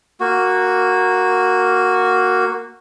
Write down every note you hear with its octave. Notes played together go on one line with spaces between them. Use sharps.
A#3 F#4